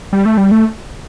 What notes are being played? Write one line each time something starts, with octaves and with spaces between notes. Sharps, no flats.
G3
A3
G3
A3